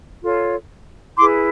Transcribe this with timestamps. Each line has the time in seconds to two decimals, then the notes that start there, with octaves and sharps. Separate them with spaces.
0.21 F4 A4 C#5
1.18 E4 G#4 B4 C6 D6